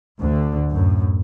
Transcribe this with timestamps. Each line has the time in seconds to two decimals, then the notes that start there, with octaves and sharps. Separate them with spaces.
0.20 D2 D3
0.71 F#2 A2